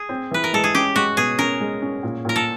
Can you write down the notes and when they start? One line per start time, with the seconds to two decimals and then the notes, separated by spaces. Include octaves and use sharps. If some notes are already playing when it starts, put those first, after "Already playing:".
Already playing: G#4
0.09 C4
0.31 E3 B4
0.44 A#4
0.53 G#3 A4
0.64 G#4
0.74 C#4 G4
0.96 G#3 F#4
1.17 B2 G#4
1.39 C#4 A#4
1.61 G#3
1.82 C#4
2.03 A#2
2.25 A#2 A#4
2.36 A4